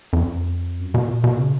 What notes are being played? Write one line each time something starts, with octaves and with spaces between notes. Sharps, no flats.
F2
F#2
B2
A#2
B2
C#3